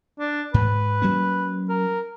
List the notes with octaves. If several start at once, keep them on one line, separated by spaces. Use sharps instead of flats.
D4
G#2 B4
F#3 A#3 C#4
A#4